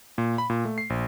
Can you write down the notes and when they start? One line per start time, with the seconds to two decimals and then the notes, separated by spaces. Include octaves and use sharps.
0.18 A#2
0.38 B5
0.50 A#2
0.65 A3
0.78 C7
0.90 A#1